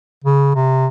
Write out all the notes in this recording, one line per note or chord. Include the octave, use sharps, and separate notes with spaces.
C#3
C3